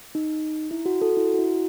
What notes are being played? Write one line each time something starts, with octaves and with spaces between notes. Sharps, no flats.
D#4
E4
F#4
F#4 A4
E4
F#4
E4